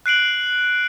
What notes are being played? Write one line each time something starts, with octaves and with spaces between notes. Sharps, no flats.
F#6 C7 D7 F#7